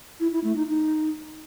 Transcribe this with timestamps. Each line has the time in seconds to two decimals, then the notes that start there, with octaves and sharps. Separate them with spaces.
0.20 E4
0.32 E4
0.44 A3
0.56 D#4
0.68 D#4